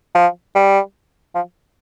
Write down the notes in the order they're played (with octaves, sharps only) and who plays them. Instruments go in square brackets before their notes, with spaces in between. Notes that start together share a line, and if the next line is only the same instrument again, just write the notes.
[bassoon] F3
G3
F3